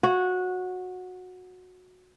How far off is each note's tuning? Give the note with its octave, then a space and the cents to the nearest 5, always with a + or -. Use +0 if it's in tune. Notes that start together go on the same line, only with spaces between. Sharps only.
F#4 -15 C#5 +0